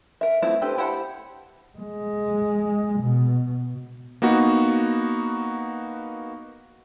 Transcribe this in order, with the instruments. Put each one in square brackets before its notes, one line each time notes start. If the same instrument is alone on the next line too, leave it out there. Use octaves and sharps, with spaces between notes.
[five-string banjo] A#4 E5
A3 B3 C4 E4 F4
D4 G4 A4 B4 C5
E4 G4 C5 F#5 A5
[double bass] G#3
B2
[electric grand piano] A#3 B3 D#4 F#4